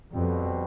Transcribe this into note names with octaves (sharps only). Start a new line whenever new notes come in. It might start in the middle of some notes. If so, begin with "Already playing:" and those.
F2 B2 G3 C4